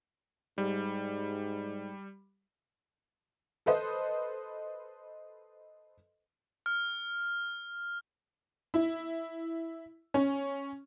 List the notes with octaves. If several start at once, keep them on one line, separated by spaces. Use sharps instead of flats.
G#2 G3
A4 B4 C5 D#5
F6
E4
C#4